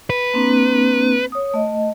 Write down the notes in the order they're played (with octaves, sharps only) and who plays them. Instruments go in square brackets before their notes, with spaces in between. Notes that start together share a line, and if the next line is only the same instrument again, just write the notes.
[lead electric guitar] B4
[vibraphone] A#3 C4 D4
C#5 D#6
A3 D#5